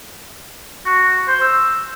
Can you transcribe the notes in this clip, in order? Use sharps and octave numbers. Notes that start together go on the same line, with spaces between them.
F#4
C5
E6